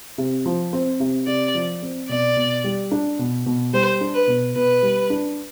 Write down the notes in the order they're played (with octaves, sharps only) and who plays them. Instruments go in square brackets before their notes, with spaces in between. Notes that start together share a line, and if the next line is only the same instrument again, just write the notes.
[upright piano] C3
F3
C4
C3
[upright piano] C3 [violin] D5
[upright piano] F3
C4
[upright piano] B2 [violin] D5
[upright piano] B2
G3
D4
B2
B2
[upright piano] G3 [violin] C5
[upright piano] D4
[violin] B4
[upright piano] B2
[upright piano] B2 [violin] B4
[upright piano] G3
D4